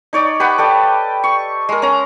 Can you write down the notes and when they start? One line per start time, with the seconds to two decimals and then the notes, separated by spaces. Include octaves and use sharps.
0.13 D#4 C#5 D5
0.40 G4 B4 F#5 B5
0.58 A4 D5 G5
1.24 C#6
1.69 G#3 A#4
1.82 C#4 A#5